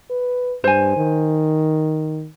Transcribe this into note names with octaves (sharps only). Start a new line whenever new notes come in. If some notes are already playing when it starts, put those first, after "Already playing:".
B4
G2 C5 G#5
D#3